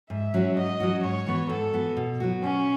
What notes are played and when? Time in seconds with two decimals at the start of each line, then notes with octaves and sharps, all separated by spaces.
0.10 G#2 E5
0.34 F#3 C#4 F#4
0.57 G#2 D#5
0.80 F#3 C#4 F#4
1.03 G#2 C#5
1.26 E3 B3 F#4
1.49 G#2 A4
1.73 E3 B3 F#4
1.97 B2
2.20 F#3 B3 F#4
2.43 B2 C#4